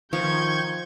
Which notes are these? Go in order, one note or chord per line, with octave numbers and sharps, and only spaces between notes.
D#3 F3 C#6 G6 G#6